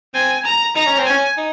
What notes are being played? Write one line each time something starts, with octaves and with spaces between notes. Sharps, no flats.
C4 G#5
A#5
D#4 A#5
C#4
C4
C#4 G#5
D#4